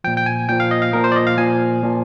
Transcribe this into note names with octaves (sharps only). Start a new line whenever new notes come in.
A#2 F3 G5
G5
G#5
A#2 F3 G5
F5
D#5
F5
A#2 F3 A#4
C5
D5
D#5
F5
A#2 F3 G#5
A#2 F3